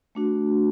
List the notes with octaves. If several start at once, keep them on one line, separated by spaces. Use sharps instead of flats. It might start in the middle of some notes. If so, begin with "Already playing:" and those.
A3 D4 F#4